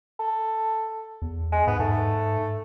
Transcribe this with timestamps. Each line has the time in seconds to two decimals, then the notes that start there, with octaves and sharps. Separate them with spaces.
0.20 A4
1.22 E2
1.52 G#3
1.67 G#2 B3
1.80 G#2 A3